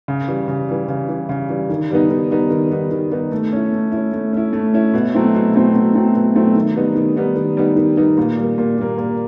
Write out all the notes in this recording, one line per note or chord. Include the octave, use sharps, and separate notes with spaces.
C#3
E3 G3
C#3
E3 G3
C#3
E3 G3
C#3
E3 G3
D#3
G3 B3 D#4
D#3
G3 B3 D#4
D#3
G3 B3 D#4
D#3
G3 B3 D#4
A3
C#4 E4
A3
C#4 E4
A3
C#4 E4
A3
C#4 E4
B2
F#3 A3 C4 E4
B2
F#3 A3 C4 E4
B2
F#3 A3 C4 E4
B2
F#3 A3 C4 E4
D#3
G3 B3 D#4
D#3
G3 B3 D#4
D#3
G3 B3 D#4
D#3
G3 B3 D#4
A#2
G3 A#3
A#2
G3 A#3
A#2